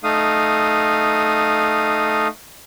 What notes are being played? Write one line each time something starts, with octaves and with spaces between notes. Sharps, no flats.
A3 D#4 F5 D#6